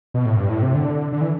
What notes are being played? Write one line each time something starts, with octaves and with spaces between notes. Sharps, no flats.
B2
A2
G2
A2
C3
D3
D3
E3